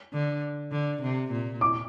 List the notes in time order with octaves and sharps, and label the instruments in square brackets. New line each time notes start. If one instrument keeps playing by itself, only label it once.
[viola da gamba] D3
D3
C3
A#2
[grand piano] D6